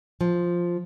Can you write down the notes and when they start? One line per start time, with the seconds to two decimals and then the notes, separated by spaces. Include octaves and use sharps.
0.21 F3